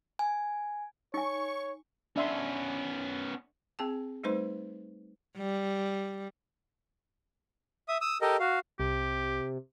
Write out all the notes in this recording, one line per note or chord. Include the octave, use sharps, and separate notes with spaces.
G#5
D#4 C#5 G#5 C#6
B3 C#4 D4 E5 C6
C4 G#4 G5 A5
G3 A3 D#4 B4 C5 C6
G3
E5 D#6
D#6 E6
G4 A4 A#4 D#5
F#4 F5
C2 C3 G4